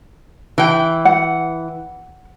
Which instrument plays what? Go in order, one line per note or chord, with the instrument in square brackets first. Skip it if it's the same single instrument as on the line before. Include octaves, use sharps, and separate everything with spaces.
[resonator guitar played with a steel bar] E3 G5
[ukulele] F#5